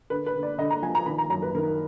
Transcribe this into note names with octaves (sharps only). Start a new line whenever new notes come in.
D3 B4
B4
D3
D5
D3 D#5
A#5
F3 G#5
A#5
D#3 B5
A#5
F#2 A#5
B4
D#3 A#4